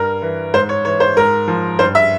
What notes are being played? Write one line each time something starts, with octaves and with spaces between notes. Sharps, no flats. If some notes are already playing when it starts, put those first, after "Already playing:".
Already playing: G2 A#4
E3
G#2 C5
C#5
E3 C#5
C5
G#2 A#4
F3
G2 C5
E5